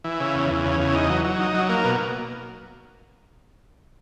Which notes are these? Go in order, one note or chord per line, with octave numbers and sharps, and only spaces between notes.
E3
C#3
E2
E2
C#3
E2
D#4
F#3
F#3
D#4
F#3
A#3
B2